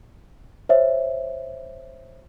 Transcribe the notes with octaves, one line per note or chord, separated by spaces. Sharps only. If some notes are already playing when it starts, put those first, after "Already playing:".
C5 C#5 E5